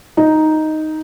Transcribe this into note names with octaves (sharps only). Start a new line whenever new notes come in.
D#4